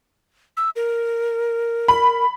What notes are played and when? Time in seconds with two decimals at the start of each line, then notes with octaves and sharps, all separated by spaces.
0.57 E6
0.76 A#4
1.88 B5